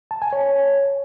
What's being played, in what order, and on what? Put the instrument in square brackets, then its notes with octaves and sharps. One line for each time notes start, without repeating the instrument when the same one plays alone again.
[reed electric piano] A5
G#5
C#5